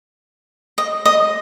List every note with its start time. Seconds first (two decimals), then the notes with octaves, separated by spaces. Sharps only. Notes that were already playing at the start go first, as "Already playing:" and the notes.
0.78 D#5
1.06 D#5